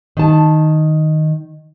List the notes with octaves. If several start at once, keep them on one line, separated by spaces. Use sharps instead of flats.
D#3 A5